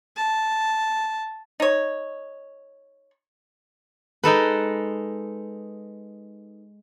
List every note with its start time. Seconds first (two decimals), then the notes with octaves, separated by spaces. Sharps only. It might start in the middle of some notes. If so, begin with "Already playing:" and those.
0.16 A5
1.60 D#4 C#5
4.24 G#3 D#4 A4 B4